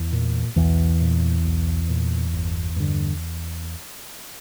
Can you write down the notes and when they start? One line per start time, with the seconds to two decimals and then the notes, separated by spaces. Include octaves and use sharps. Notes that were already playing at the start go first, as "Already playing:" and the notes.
Already playing: E2 E3
0.12 A#2
0.56 B1 E2 E3
1.00 A#2
1.45 B1
1.89 A#2
2.33 G1
2.76 G2 D3